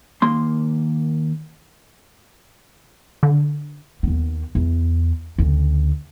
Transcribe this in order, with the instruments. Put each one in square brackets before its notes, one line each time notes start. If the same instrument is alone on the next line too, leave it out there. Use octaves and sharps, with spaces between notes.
[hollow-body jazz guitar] D#2 A#3 C6
[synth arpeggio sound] D3
[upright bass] D#2 B3
E2
D2 C#3